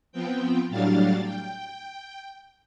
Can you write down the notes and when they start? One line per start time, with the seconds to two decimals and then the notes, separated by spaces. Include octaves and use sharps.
0.12 F3 B3 C4 G5
0.69 A2 F#3 G3 D4 F5 A6
1.24 G5